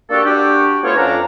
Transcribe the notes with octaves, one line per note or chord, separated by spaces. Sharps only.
A#3 D4 F#4 G4 A4
D4 F#4 G4
A3 B3 F4 C5 C#5
F2 C#4 D4 F5 A#5